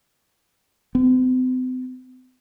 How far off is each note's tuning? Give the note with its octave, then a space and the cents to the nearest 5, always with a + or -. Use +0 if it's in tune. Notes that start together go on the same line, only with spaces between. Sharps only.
C4 -45